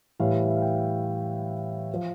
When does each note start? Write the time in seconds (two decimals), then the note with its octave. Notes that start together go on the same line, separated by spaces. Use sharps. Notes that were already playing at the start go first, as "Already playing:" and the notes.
0.19 A2 E3 G3 F5
0.34 F5
0.48 E5
0.57 F5
0.62 G5
1.94 F3